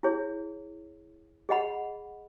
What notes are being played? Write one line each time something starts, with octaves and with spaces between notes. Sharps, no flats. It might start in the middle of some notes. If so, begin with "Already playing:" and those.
E4 G#4 C#5
G#4 D#5 F#5 B5